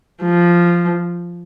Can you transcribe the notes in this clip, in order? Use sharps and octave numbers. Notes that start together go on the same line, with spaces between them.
F3